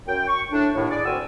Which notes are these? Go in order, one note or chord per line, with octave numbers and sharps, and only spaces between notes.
F#2 G5
C#6
A2 D4
D#2 A2
G#4 D5
D2 C4 F#4 A#4 G#5 E6